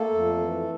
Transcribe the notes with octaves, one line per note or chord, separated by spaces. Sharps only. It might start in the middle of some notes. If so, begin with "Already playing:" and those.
Already playing: A3 A#3 A4
F2
E3